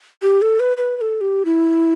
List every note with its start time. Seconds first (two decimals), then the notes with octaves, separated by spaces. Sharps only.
0.22 G4
0.42 A4
0.60 B4
0.77 B4
0.97 B4
1.01 A4
1.21 G4
1.45 E4